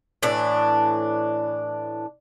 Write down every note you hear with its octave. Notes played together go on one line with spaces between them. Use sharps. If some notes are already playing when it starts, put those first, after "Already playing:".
A2 E3 D4